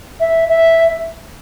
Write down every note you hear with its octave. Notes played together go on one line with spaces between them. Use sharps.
E5
E5